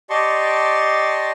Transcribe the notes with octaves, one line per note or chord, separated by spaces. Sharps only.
G4 D5 D#5 A5 C6 C#6